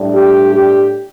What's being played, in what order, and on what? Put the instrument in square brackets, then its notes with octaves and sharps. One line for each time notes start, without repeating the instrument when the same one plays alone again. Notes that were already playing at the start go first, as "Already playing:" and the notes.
Already playing: [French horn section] A2 G3 D4
G4
G4